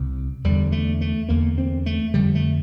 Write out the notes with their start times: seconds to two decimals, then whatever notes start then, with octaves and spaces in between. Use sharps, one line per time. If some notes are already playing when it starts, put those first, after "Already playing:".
Already playing: C2 C3
0.44 E2 D3 G3
0.67 G3
0.72 A3
1.01 A3
1.29 E2 D3 A#3
1.58 C4
1.86 A3
2.14 F2 D3 G3
2.35 A3